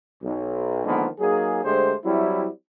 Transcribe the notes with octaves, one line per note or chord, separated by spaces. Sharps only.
B1
D3 D#3 F3 G#3 A#3 B3
F#3 A#3 D#4 G#4
D3 G#3 A3 G4 C5
F#3 G3 C4 E4